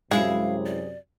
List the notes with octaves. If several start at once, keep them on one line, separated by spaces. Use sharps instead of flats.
F#2 C3 G#3 E4 G#4 F5
D5